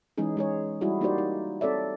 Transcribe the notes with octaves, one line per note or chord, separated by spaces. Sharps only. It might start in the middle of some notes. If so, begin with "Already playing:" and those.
E3 G#3 C#4 D#4 G#4
G#3 G#4 C#5
G3 E4 F#4 G#4
A#3 D#4 F#4 G4 C5 D5
D#4
C4 A4 C#5 D5 E5